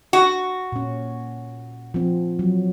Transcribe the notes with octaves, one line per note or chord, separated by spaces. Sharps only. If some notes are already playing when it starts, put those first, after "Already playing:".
F#4
A#2 C#4
F3 C4
F#3